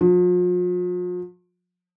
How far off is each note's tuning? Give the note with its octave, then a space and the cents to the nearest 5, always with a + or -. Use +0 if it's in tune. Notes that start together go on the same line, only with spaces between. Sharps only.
F3 +45